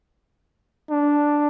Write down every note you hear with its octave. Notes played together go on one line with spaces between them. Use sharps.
D4